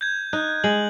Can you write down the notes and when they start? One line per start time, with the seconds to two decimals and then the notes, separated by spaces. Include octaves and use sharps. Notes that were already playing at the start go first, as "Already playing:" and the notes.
0.01 G6 G#6
0.33 D#4 F#6
0.64 G#3 F#7